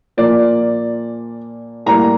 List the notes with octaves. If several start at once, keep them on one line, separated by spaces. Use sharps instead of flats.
A#2 F3 A#3 D5
A2 G3 A#3 A#5